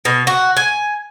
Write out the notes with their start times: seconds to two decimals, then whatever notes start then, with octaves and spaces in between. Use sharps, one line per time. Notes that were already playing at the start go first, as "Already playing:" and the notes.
0.05 B2
0.27 F#4
0.57 G#5